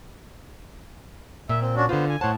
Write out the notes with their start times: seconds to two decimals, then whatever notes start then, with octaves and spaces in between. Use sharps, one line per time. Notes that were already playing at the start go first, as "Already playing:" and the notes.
1.49 A#2 E5
1.61 C4
1.76 C#4 D4 F#4
1.89 D3 B3 F4 C5
2.09 G#5
2.21 A2 C5 C#5 F#5 A5